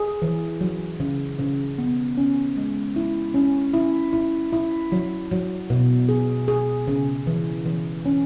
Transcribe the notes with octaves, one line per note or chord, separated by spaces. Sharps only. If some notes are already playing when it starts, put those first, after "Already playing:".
Already playing: G#4
E3
F#3
C#3
C#3
B3
C#4
G#3
E4
C#4
E4
E4
E4
F#3
F#3
B2
G#4
G#4
C#3
E3
E3
C#4